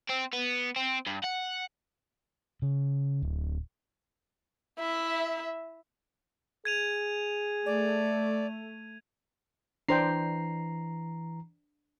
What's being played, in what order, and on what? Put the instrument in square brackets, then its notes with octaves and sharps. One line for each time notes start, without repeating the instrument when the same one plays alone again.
[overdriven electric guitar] C4
B3
C4
G2
F#5
[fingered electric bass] C#3
D1
[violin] E4 E5
[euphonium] G#4 [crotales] G#6 D#7 F7
[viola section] A3 [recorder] D5
[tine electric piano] E3 A#5 C7 [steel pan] D4 C5 G5